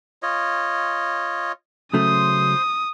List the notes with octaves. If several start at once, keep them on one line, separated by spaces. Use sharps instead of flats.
F4 C#5 D#5
C#3 F#3 A3 C5 C6 D#6